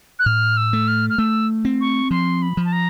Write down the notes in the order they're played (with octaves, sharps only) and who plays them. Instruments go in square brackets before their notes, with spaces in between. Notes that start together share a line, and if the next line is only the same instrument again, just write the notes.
[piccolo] F#6
[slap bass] A2 [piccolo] F6
[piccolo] E6
[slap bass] A3
[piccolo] F6
F6
[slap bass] A3 [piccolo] E6
[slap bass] C4
[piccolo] C#6
[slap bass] F3 [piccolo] C6
[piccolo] B5
[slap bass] F3
[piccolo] A5
A#5